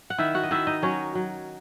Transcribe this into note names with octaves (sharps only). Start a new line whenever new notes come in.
F#5
D#3 E4 E5
F#4 F#5
D#5
D#3 E4 E5
D#4 D#5
F#3 C#4 C#5
F#3